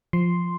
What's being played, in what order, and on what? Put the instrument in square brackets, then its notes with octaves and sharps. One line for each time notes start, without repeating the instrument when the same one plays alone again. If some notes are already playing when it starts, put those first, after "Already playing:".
[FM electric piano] F3 C6